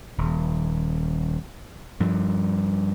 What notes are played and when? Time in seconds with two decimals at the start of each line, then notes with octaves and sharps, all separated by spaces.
0.18 D#1
2.00 G2 F3 G3